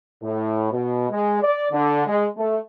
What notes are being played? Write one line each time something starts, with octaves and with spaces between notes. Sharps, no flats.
A2
B2
G#3
D5
D3
G#3
A3